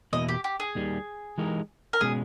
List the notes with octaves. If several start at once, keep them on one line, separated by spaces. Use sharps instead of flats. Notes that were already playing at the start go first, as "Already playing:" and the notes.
E2 B2 A#3 E4 D#5
G4
G4
G#4
D#2 D#3 G3
E3 G#3 D#4 G4 A#4
A#4
B2 G#3 C#4 G#4